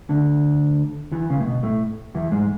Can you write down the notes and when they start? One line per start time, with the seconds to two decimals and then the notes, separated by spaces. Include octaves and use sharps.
0.09 D2 D3
1.12 E2 E3
1.30 C#2 C#3
1.40 A2
1.46 B2
1.63 A2 A3
2.15 E2 E3
2.32 G#2 G#3